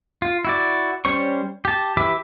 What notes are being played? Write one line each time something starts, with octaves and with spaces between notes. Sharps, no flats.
F4
E4 F#4 D5
G3 C#4 C5 C#5 C#6
G4 A5
E3 G4 E5 B5 D6